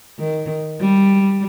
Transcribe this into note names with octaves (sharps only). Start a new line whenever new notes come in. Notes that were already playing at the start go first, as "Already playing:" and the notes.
D#3
G3